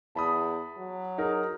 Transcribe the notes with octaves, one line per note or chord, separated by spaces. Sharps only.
E2 A5 B5 D#6
F#3
D#4 G#4 A#4